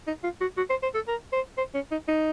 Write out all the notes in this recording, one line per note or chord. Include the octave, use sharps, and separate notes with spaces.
D#4
F4
F#4
F#4
C5
C5
A4
A#4
C5
C5
C#4
D#4
D#4